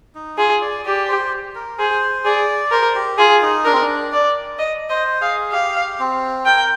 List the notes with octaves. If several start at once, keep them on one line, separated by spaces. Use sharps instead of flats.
D#4
F4 G#4
D5
G4 D5
C5
A#4
G#4 C5
G#4 D5
A#4 C5
G4
F4 G#4
D#4
D4 A#4
C4
D4
D5
D#5
C5 D#5
G#4 F5
G4 F5
C4
A#4 G5